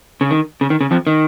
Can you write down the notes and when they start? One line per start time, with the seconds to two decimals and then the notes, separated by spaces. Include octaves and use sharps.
0.21 C#3
0.30 D#3
0.61 C#3
0.70 D#3
0.81 C#3
0.91 F2 F3
1.07 D#3